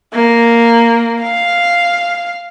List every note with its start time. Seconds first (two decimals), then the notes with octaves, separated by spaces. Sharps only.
0.13 A#3
1.22 F5